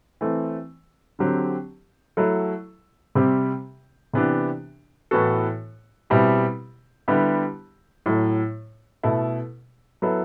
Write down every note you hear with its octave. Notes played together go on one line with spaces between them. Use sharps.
E3 A3 C4
D3 F#3 C4 G4
F#3 A3 E4 A4
C3 G3 C4 G4
C3 E3 B3 D4 G4
A2 E3 B3 F#4 A4
B2 G3 C4 E4 G4
D3 G3 B3 E4 G4
A2 F#3 A3
B2 A3 E4 A4
F#3 B3 E4 A4